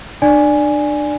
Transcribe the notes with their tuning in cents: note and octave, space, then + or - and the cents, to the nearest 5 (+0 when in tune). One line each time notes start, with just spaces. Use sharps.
D4 +30 D5 +0 G#5 +0